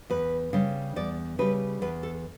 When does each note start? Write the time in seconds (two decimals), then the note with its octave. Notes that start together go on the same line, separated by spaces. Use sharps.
0.10 E2 B4
0.53 C#3 G3
0.96 E2 D5
1.39 C#3 G3 B4
1.82 E2 B4
2.03 A4